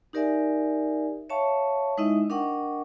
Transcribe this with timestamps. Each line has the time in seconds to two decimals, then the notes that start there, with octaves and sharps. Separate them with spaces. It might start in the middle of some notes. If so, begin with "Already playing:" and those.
0.13 D#4 G4 A#4 D5 E5 G#5
1.29 C#5 E5 F5 G5 A5 C#6
1.98 G#3 D#4 E4 D#5 E5 D#6
2.30 D4 A#4 D#5 F#5 G5 C#6